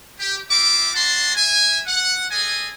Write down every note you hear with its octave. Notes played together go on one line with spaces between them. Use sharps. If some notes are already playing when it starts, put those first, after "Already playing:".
G4
C4 F4 E5 D6
D4 F#4 F#5 A5 C6
E5 G#5
F#5
G#4 A4 D#5 G#5